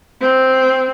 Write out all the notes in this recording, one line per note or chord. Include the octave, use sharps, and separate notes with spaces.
C4